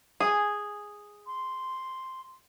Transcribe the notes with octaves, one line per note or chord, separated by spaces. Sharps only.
G#4
C6